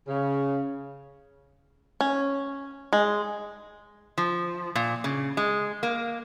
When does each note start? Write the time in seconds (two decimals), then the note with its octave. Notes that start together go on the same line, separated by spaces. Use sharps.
0.08 C#3
2.01 C#4
2.93 G#3
4.18 F3
4.75 A#2
5.04 C#3
5.37 G#3
5.83 A#3